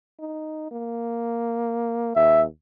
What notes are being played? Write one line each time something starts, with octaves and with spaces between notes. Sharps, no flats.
D#4
A#3
D#2 E5